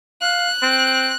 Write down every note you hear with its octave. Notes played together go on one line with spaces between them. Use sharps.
F5 F#6
C4